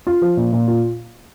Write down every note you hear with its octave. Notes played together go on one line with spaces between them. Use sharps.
F4
F3
A#2
A#2
F4